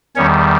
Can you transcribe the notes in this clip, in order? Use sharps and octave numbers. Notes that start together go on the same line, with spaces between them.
E2 D#3 G3 C#4 C#5